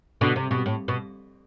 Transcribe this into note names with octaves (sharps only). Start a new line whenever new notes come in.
B2 D3
C3
B2
A2
B2